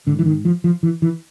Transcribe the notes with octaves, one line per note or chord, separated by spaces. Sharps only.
G#2 D3
E3
D#3
F3
F3
E3
E3